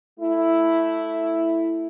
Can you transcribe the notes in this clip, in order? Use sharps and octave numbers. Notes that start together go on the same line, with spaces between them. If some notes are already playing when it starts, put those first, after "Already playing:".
A3 E4